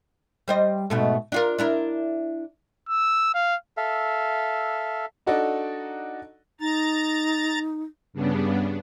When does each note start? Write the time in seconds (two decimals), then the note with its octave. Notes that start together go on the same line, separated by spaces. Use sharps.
0.48 G3 C5 D#5
0.90 G#2 B2 A3
1.32 D4 F4 A#4
1.58 D4 E4 A#4
2.89 E6
3.35 F5
3.77 A4 E5 F5
5.26 D4 D#4 F#4 A4 D5 D#5
6.60 D#4 A#5 A6
8.13 G2 C#3 B3 D4